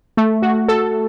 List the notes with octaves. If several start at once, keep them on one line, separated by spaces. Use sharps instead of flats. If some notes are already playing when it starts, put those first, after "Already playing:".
A3
F#4
A4